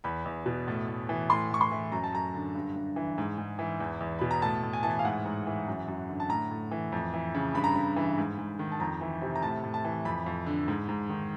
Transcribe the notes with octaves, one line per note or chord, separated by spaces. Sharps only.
E2 B5
E2
B2
A2
A2
E3
A2 C6
A2 C#6
C6
E3
F#2 A#5
A5
F#2 A#5
D3
G2
G2
E3
G#2
G#2
E3
E2
E2
B2 B5
A#5
A2 A5
A2
G#5
E3 A5
G#5
F5
G#2 F#5
G#2
E3
F#2
F#2
D3
A5
A2 A#5
A2
E3
F2
E3
C#3
G2 B5
A#5
G2 B5
E3
G#2
G#2
D#3
A5
F2 A#5
E3
C3
A#5
A2 A5
A2
A5
E3
F2 B5
F2
D3
G#2
G#2
D#3